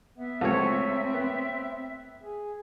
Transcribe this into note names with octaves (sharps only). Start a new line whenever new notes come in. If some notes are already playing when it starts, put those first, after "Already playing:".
B3 E5
C#2 F3 A3 C4 C#5
B3
G#4